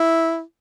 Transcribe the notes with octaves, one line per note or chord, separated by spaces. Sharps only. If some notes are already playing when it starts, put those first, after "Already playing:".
Already playing: E4